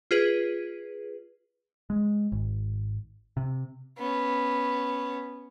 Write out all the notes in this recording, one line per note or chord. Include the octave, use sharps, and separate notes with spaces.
F4 G#4 B4
G#3
G#1
C3
B3 C#4